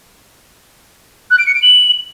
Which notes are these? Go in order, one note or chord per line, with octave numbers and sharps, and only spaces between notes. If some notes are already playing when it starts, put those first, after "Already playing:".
F#6
D7
C#7
D7
F#7